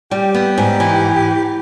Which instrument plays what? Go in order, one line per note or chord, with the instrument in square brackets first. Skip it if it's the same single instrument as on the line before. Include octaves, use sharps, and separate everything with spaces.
[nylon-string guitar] G3 [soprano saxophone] G4
[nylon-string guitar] B3
G#2
E3